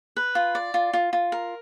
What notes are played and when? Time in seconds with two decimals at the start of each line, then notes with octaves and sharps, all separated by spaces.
0.17 B4
0.35 F4
0.55 D5
0.74 F4
0.93 F4
1.13 F4
1.32 A#4